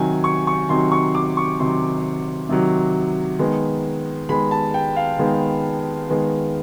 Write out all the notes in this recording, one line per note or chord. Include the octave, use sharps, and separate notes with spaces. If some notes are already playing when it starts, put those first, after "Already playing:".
Already playing: C3 D#3 F#3 G#5
C#6
C#6
C3 D#3 F#3 C6
C#6
D6
C#6
C3 D#3 F#3 C6
C3 D#3 F#3
D#3 G#3 B3
D#3 G#3 B3 B5
A5
G5
F5
D#3 G#3 B3
D#3 G#3 B3